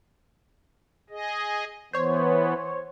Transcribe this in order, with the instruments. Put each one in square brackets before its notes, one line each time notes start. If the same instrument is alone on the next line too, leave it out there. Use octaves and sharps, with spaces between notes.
[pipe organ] G#4 D#5
[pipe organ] E3 B3 [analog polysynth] C5 C#5